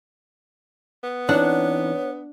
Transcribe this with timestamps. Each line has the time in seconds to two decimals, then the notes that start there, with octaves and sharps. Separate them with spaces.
1.04 B3
1.29 E3 C4 D4 D#4 C#5 F#5